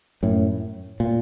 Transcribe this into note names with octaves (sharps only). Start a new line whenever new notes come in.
F#2 A2
A#2